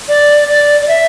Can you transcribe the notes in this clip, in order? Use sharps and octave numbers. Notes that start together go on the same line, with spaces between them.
D5
D5
D5
E5